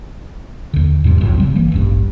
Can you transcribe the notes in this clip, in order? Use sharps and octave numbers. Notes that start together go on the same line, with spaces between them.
D#2 D3
E2 G#2 C3 G3
G1 C2 F2 A2
C#3 G3 C4
G1 E3 A#3
D#1 A1 G2